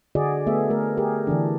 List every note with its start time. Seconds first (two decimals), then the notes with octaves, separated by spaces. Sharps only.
0.15 D3 F#4 G#4 D5 D#5
0.46 A3 B3 G#4 E5
0.70 A3 A#4
0.97 G4 G#4 A#4
1.27 D3 E3 D4